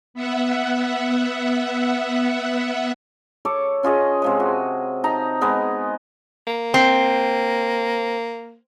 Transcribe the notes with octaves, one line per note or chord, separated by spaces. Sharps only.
B3 E5 F#5
A4 C#5 C#6 D6
C#4 F4 G#4 D#5
C3 F3 G#3
F#4
D#4 A5 A#5
G#3 B3 A#4 D#5
A#3
C4